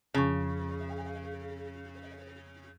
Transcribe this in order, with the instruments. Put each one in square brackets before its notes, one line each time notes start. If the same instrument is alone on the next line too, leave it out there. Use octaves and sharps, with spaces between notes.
[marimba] F2 F3 C#6 [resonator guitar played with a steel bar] C#3